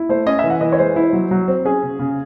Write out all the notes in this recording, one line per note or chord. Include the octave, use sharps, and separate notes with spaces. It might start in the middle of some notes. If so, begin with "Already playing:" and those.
Already playing: E4
A3 C5
C#4 D#5
E5
E3
F#5
E3 D#5
C#5
G#3 C5
E4
F#3
F#3
C4
C#4 G#4
C#3
C#3